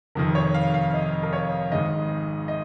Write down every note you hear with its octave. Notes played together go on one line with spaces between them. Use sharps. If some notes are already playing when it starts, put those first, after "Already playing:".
F1 F2 D#3 A#4
C#5
F5
F5
D#5
A#4
C#5
G#1 G#2 D#3 D#5
D#5